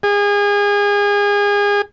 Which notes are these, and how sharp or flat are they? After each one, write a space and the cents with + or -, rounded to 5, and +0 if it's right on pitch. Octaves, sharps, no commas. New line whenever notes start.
G#4 -30